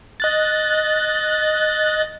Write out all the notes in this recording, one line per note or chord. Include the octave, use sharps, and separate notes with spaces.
D#5 F#6 A6